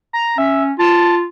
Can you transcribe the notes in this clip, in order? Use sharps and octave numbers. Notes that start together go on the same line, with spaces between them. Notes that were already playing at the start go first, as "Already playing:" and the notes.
A#5
C#4 E5
F4 A5